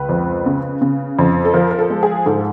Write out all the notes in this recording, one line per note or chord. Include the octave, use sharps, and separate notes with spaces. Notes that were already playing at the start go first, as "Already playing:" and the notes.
Already playing: C#2 B4
F2
C#3
C#3
F2
A4
F3 A#4
A#4
A4
G#3
G#4
G#2 A4